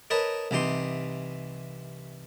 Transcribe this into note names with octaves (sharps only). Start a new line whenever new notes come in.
A#4 B4 C#5 D#5 A5
C2 E3 D#4 G4 C6